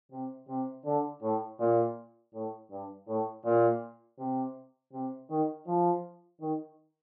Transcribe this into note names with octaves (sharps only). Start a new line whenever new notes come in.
C3
C3
D3
A2
A#2
A2
G2
A2
A#2
C3
C3
D#3
F3
D#3